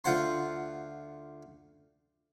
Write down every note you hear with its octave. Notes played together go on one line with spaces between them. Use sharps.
D2 F4 C5 F#5 C6